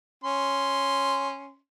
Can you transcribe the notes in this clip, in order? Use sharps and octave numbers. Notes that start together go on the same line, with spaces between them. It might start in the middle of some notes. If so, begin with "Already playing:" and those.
C#4 C6